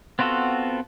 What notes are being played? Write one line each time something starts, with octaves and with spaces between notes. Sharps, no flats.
B3 C4 F4 F#4 A4